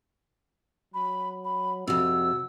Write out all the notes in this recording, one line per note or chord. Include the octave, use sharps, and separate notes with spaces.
F#3 B5
B5
F2 C3 F#4 E6